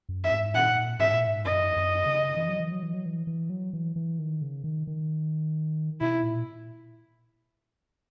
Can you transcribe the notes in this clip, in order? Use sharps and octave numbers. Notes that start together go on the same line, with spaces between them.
F#2
E5
G#2
A#2 F#5
G#2 E5
A#2
G#2
F#2 D#5
F#2
C#3
E3
F#3
E3
F#3
E3
F#3
E3
E3
F#3
E3
E3
D#3
C#3
D#3
D#3
B2 E4
A#2